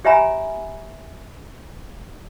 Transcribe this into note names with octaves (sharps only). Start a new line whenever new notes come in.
G4 C#5 E5 G#5 A#5 B5